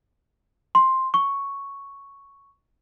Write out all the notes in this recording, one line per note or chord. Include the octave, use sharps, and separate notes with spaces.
C6
C#6